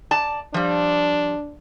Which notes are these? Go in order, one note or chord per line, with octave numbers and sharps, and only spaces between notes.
D5 A5
F3 G3 D4